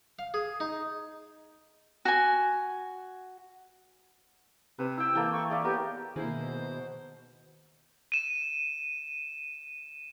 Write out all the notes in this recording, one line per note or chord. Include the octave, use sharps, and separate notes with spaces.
F5
G#4
D#4
F#4 G#5
C3 B4
E4 G5 E6
E3 A#3 A4 G5
C#6
G#4 D5 E5 F5
B3 G4 A#4 C#5
B2 D#3 A#3 E4 G#4 C5
D#7 E7